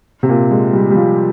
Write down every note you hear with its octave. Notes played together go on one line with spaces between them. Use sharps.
C3
A#2
G#3
G3
G3
F3